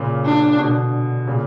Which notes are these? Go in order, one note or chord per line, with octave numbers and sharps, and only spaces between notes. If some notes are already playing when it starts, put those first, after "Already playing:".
Already playing: A#2 C#3
D4
B2 D3
A#2 C#3